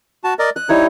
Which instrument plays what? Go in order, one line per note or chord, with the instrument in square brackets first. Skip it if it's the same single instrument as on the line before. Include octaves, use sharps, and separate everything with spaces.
[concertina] F#4 A5
A#4 D5 D#5
[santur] D#5 [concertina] F#6
[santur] G3 E4 D#6 [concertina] D#4 C#5